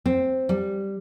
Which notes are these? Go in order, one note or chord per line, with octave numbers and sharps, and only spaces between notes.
C4
G3